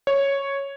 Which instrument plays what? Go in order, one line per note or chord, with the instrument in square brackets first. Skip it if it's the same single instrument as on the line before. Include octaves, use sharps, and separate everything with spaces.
[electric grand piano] C#5